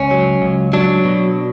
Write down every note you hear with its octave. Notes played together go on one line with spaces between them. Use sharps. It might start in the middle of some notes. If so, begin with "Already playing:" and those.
Already playing: C#2 C#4
F#3
C#2
F#3 D4
B2